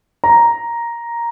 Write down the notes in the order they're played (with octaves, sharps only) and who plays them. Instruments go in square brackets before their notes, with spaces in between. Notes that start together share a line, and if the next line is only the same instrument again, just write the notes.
[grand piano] A#5